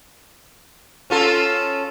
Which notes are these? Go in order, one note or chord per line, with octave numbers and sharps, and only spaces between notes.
C#4 F4 A4